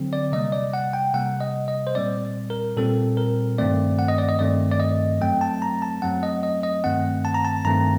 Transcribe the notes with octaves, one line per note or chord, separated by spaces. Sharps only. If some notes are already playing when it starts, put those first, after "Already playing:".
Already playing: D3 F#3 C4
D5
C3 G3 A#3 D#5
D5
F#5
G5
C3 G3 A#3 F#5
D#5
D#5
C5
A#2 G3 C4 D5
A#4
A#2 G3 C4 A4
A#4
G2 D#3 A3 C4 D5
F#5
D#5
D5
D#5
G2 D#3 A3 C4 D5
D5
D#5
F#2 F#3 A3 C4 G5
A5
A#5
A5
F#2 F#3 A3 C4 F#5
D#5
D#5
D#5
G2 D#3 A3 C4 F#5
A5
A#5
A5
G2 D#3 A3 C4 A#5